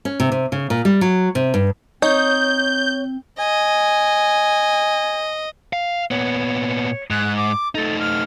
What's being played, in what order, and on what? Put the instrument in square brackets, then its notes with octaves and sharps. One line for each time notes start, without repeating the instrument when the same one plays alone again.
[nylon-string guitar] C#4
C3
C3
C#3
A#2
G3
F#3
C3
G2
[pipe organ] C4 [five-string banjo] D#4 [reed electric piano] C#5 [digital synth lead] G6
[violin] D#5 [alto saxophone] G#5
[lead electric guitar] F5
[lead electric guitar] A#2 B3 [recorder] C#5
[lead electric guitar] G#2 [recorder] F#6
[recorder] D6
[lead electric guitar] A3 D#4 [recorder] A4
[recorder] F6